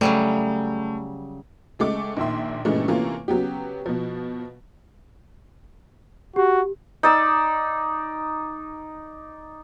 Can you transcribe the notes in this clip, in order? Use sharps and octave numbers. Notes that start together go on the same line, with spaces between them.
C#3 F#3 G3 A3
C#2 G#3 A3 D6
A#1 A#2 D#3 E5 C6
G2 A#2 C#3 E3 G#3 A3
C3 E3 A3 A#3 C#4 F4
C#3 F#3 B3 G4
B2 F3
F#4 G4
D#4 D5 E6